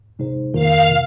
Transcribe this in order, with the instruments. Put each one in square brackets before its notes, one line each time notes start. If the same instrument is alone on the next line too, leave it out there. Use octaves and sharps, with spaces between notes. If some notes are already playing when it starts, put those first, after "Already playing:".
[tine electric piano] C3 G#3 D#4 G#4 C5
[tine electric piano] F2 D#3 A#3 F4 A#4 [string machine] F5
[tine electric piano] C3